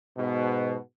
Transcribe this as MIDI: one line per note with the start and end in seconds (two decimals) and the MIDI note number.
0.18 0.76 44
0.18 0.76 47